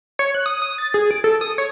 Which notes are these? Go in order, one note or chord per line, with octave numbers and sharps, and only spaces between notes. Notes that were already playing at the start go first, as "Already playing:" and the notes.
C#5
F#6
D#6
D#6
A6
G#4
D7
A4
D#6
C#5